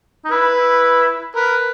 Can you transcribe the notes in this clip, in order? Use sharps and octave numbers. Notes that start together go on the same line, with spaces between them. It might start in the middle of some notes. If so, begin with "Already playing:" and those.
D#4
E4 B4
E4
A#4 B4